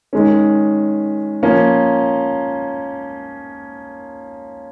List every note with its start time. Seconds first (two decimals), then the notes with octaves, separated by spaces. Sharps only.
0.13 D#3 G#3 C#4
1.43 F3 A#3 C#4